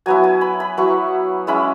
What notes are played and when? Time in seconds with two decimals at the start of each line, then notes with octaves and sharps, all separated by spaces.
0.06 F#3 B3 E4 G#5
0.24 G#5
0.41 B5
0.60 B5
0.77 F#3 B3 E4 C#6
1.47 G#3 C#4 E4 B5